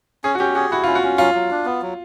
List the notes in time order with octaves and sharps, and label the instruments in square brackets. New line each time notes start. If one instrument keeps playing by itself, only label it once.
[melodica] C#4 [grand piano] G#4
[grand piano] F#4
[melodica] C#4 [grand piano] G4
[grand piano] F#4 [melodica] G#4
[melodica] E4 [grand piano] F#4
[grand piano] F4
[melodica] C#4
[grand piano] F#4
[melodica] C#4
[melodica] F#3 [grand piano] F4
[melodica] F#3
D4
B3
F#3